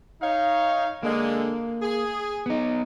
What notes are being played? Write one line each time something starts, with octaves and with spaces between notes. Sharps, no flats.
D#4 C#5 F5
D3 G#3 A#3
G#4
B3 D#4